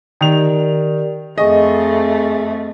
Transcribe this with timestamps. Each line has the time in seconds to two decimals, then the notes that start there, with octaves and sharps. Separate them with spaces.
0.21 D#3 G4 A#4 D5 F7
1.38 F2 A3 G#4 D#5 G#5 C#6